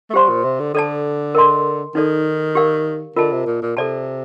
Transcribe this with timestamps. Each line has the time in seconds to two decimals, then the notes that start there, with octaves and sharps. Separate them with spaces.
0.10 A3
0.14 G3 G4 C5 F5 C6
0.29 A#2
0.44 C3
0.60 D3
0.74 D3 A4 D5 A5
1.35 A#4 D#5 A5 C6
1.95 D#3 D#4 A4 D5
2.55 G4 A#4 D5 F5
3.16 D3 F4 A#4 D#5 A5
3.32 C3
3.47 A#2
3.62 A#2
3.77 C3 A4 D5 A5